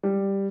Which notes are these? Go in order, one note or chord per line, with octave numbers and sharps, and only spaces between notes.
G3